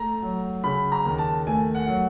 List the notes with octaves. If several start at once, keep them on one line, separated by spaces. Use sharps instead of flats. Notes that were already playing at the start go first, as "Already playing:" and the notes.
Already playing: A3 A#5
F#3
C#3 B5
A#5
D#2
A5
A3 G#5
F#5
F#3